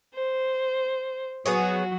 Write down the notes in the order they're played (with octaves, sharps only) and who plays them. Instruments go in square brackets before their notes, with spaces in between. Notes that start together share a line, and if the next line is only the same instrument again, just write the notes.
[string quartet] C5
[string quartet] F#3 F#4 [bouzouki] B3 G#4 C#5